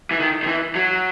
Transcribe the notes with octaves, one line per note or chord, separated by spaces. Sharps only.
E3
D#3
D#3
E3
F#3